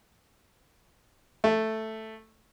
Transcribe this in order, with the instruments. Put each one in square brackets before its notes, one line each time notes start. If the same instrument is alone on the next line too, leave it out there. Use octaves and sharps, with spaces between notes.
[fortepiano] A3